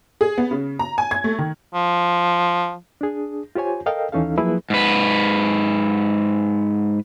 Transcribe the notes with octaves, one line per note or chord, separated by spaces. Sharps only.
G#4
B3
C#3
A#5
G#5
G#6
A3
D#3
F3
D4 G#4
F4 G4 C5 C#5 G#5
A4 A#4 D#5 F5 G5
D#2 E3 C#4 D#4 A4 F5
F3 F#3 A#3 E4 G#4 B4
G#2 B4